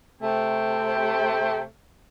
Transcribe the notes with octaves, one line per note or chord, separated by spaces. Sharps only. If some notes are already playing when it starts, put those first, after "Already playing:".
C3 A3 G5